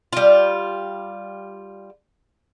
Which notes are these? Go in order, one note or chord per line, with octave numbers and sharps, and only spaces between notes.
G3 F4